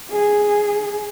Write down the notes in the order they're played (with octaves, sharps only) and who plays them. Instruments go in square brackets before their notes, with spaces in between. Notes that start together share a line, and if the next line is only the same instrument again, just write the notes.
[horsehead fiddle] G#4